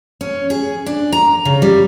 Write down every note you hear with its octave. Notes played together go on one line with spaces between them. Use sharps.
C#4
G#4
D4
A#5
C#3
G3